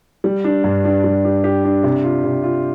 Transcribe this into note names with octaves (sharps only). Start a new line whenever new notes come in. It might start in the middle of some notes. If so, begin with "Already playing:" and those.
G3
D4
G2
D4
G3
G4
G4
D4
C3
F4
C3
F4